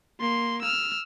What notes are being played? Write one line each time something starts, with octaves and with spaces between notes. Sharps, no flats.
A#3 C6
E6 F6